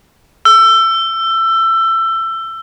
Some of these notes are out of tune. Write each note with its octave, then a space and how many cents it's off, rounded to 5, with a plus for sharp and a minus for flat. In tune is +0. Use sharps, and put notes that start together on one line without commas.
E6 +20